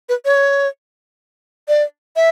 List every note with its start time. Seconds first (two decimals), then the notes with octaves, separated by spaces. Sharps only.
0.09 B4
0.25 C#5
1.68 D5
2.16 E5